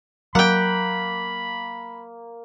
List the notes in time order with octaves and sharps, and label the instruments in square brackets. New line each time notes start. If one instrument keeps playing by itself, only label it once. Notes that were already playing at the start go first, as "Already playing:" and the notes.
[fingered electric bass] F#3 [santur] A#3 [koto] F#5 G5 [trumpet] B5